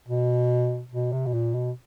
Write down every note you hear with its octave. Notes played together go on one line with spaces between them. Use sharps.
B2
B2
C3
B2
A#2
B2